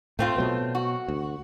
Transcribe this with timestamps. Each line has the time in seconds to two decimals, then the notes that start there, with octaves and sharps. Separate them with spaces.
0.19 A2 A3 C4 F4
0.37 B2 F#3 B3
0.75 F#4
1.08 D2